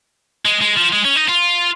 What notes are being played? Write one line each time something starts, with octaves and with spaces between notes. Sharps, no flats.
G#3
G#3
F3
G#3
C#4
D#4
F4